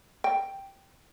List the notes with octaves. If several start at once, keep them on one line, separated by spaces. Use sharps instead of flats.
G5